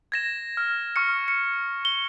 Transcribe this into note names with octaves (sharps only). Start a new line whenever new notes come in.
G#6 A#6 E7
F6
C#6 F6 C#7
C#7
G7